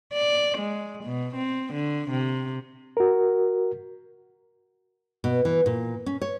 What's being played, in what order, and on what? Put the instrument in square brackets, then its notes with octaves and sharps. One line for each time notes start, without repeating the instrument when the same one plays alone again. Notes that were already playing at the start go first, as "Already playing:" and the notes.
[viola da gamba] D5
G#3
B2
C4
D3
C3
[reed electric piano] F#4 A#4
[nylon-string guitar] B2
E3
A#2
C#4
C#5